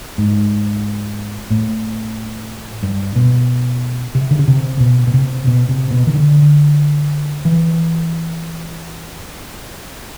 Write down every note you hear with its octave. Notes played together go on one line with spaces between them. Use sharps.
G#2
A2
G2
B2
C3
D3
C#3
C3
B2
B2
C3
B2
C3
B2
D#3
D3
E3